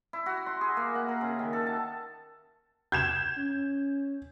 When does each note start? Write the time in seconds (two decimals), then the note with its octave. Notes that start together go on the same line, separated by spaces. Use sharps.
0.13 E4
0.26 F#4
0.46 C6
0.61 G#4
0.77 A#3
0.95 F#5
1.08 A#4
1.21 C#3
1.39 D#3
1.53 A4
1.66 A5
2.92 G6 G#6 E7
3.38 C#4